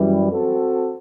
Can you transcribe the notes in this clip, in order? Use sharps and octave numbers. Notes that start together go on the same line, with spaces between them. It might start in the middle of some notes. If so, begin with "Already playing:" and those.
Already playing: F#2 E3 G3
C4 F#4 A4